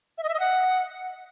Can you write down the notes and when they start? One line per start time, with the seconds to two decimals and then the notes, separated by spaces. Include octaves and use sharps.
0.18 E5
0.23 D#5
0.29 E5
0.34 D#5
0.40 F#5